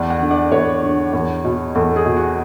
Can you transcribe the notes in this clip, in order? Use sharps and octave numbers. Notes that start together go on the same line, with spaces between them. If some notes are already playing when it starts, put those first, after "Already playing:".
Already playing: E2 D5
F#5
D3
D5
E2 C#5
D3
E2
B2
E2 A4
G#4
B2
F#4